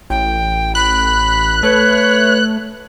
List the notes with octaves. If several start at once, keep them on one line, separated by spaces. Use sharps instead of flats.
A1 G5
B5 F#6
A3 B4 C#5